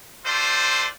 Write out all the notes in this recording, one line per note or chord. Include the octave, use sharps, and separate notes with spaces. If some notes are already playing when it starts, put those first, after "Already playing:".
A3 C4 F4 C5 D5